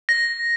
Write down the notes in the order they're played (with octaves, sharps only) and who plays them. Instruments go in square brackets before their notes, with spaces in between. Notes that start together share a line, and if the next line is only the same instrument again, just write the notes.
[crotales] A#6